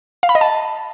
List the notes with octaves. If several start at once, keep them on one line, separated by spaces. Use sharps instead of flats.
F5
B5
D#5
A5